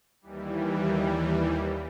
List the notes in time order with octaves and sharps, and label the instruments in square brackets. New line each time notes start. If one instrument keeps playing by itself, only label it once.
[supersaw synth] D#2 E3 G3